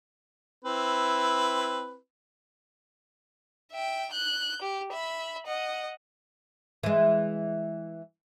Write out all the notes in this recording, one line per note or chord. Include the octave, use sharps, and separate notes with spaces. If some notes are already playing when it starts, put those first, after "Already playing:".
C4 E4 B4
E5 G5
F#6 G6
G4
E5 B5
D#5 F#5
E3 G#3